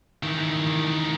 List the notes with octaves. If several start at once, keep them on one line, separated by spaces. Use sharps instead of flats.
D#3 E3